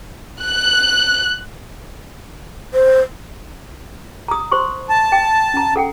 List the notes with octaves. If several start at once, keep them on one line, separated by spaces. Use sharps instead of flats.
F#6
C5
A#5 D#6
C5 C6 C#6
A5
G5
C#4 A#5
A4 F#5 G5